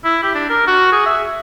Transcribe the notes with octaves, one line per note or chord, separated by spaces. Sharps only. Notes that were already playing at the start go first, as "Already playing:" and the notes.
E4
G4
D4
A#4
F#4
G#4
E5